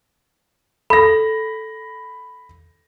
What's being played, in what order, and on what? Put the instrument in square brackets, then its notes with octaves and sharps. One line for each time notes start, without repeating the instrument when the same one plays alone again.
[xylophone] A4 [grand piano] B5 A#6